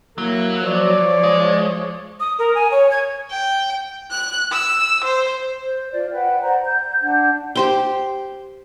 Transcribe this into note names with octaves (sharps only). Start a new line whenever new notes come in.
F#3 A#3 E4
F3 C#5 D5
G#3
D#6
A#4
G#5
C#5
G#6
G5
F#6
E6
C5
C5
F4 D5
B4 F#5 G5
C5 D5 F#5 A#5
G6
D4 F#5 G6
G4 C5 G5